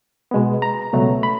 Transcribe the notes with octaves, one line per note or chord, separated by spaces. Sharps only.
B2 G#3 B3
A#5
C#2 B2 F#3 A3
B5